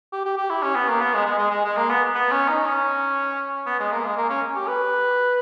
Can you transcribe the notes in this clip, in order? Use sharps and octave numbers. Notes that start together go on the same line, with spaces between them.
G4
G4
G4
E4
C#4
B3
A#3
B3
G#3
G#3
G#3
G#3
G#3
A#3
B3
B3
C#4
D#4
C#4
B3
G#3
A#3
G#3
A#3
C#4
G4
B4